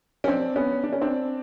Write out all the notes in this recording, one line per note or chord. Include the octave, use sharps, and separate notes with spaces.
C#4
C4 D4
B3 C#4
D4
C#4
C4 D4